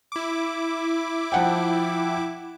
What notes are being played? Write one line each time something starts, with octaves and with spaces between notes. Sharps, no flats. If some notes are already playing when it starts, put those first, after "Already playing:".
E4 D6
F3 F#5 G5